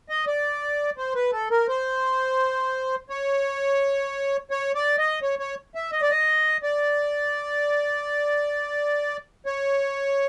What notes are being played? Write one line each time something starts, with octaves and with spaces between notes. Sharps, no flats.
D#5
D5
C5
B4
A4
A#4
C5
C#5
C#5
D5
D#5
C#5
C#5
E5
D#5
D5
D#5
D5
C#5